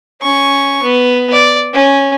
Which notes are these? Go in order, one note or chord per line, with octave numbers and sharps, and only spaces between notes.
C#4 C#6
B3
D5
C#4